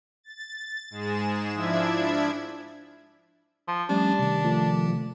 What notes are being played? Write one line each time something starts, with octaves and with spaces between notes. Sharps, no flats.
A6
G#2 G#3 G#4 E7
F3 D4 E4 E5 G#6
F3
F3 G3 A3 C#4 D4
C3 D#3
F3 A3